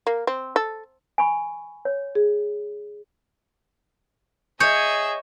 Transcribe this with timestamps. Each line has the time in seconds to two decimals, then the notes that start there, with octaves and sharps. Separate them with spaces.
0.07 A#3
0.27 C4
0.56 A4
1.18 G#5 B5 C#6
1.85 C#5
2.15 G#4
4.60 G#4 C#5 D#5 E5 G6